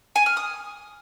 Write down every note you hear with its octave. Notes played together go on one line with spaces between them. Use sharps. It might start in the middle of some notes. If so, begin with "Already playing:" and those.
G#5
F6
D#6